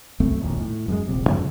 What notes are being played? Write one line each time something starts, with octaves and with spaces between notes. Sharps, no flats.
C2 F#2 A3 C4
E1 A#1 D#2
A2
F#2 G3 G#3
D#1 A#1 C3
F#2 C#3 F3 G#3